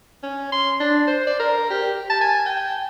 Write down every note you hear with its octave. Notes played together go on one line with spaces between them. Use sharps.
C#4
C6
D4
C5
D5
A#4
G4
A5
G#5
G5